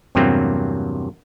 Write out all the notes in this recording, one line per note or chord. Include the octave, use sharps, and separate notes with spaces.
E2 G2 C3 F#3 A#3 C4